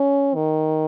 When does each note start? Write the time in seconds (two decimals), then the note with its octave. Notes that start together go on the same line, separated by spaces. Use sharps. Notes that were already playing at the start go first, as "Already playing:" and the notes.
Already playing: C#4
0.35 D#3